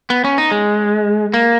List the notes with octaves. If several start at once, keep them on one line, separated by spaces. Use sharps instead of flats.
B3
C#4
D#4
G#3
A#3